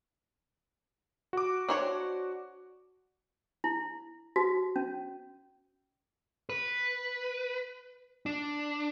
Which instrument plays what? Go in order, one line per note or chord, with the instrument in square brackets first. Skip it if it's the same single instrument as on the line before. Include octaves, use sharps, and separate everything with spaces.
[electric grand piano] F#4 D6
[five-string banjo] D4 C5 C#5
[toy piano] E4
F#4
C#4
[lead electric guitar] B4
D4